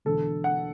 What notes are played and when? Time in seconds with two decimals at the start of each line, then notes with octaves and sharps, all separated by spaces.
0.05 E1 E2 D3 A4
0.44 F#5